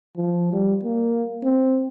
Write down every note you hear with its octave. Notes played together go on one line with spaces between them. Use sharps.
F3
G3
A#3
C4